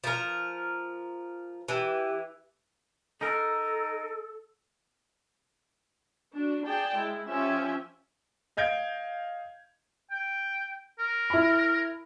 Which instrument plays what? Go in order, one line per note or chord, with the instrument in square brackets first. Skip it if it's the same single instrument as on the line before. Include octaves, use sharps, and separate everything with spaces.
[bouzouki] F3 A#4
[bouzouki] E3 [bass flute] G4
[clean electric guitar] D#4 A#4 [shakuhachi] A4
[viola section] D4 F#4
G#4 D5 G5 A5
G#3 E4
F3 C#4 G4 E5 G#5
[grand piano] D#5 F5 G6 G#6 D7
[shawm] G5
A#4
[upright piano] E4 B5